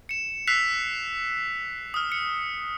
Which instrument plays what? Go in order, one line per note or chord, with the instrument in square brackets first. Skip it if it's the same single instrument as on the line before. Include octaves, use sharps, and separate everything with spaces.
[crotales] C#7 E7
E6 F#6 B6 C7 F7
D#6 F6
C#7